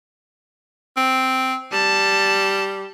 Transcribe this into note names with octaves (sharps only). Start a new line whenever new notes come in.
C4
G3 A5